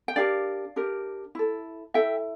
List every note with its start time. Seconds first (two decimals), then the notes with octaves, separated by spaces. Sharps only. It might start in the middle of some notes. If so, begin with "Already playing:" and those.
0.08 G5
0.16 D4 G4 A#4 D5 F5
0.76 D4 G4 A#4
1.35 E4 A4
1.94 E4 A4 E5 G5